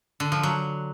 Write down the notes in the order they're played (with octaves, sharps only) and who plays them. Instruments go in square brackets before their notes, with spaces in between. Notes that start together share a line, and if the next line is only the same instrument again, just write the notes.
[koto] D3
F3
F#3